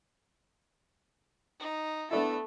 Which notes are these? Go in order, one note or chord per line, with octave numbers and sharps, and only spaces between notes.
D#4
A3 B3 D4 E4 A4